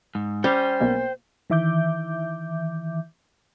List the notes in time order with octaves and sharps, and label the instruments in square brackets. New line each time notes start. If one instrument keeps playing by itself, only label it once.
[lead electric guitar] G#2
[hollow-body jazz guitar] G3 C#4 [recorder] C5 [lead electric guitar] G5
[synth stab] B1 B2 A#3
[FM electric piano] D#3 E3 E5 D6 G6